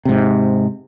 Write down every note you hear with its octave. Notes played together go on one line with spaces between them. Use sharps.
G#2 C3